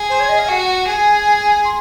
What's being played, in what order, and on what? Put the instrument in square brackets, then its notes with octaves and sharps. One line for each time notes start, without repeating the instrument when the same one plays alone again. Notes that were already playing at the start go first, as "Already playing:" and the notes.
Already playing: [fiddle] G#4
[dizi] C5
C#5
D#5
F5
[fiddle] F#4 [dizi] F#5 G#5
[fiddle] G#4 [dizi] G#5
[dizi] C6